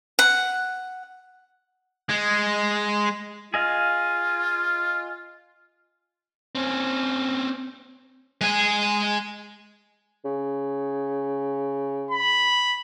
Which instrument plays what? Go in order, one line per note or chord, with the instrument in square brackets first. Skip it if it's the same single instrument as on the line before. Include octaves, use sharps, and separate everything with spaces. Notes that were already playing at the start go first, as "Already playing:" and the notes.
[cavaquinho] F#5
[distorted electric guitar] G#3
[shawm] F4 [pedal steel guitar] G#4 D#5 F5
[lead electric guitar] C4 C#4
[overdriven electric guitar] G#3 G#5
[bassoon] C#3
[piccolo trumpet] B5